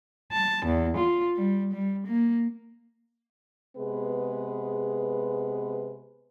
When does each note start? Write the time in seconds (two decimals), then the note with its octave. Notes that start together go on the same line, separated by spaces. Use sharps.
0.33 A5
0.66 E2
0.97 F4
1.36 G3
1.74 G3
2.07 A#3
3.76 C3 G#3 B3 G#4 B4